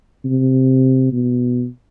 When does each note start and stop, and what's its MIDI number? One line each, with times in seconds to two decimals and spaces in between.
0.25 1.11 48
1.12 1.66 47